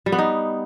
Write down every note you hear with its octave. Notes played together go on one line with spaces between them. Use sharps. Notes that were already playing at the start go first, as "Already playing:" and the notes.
G3
B3
D#4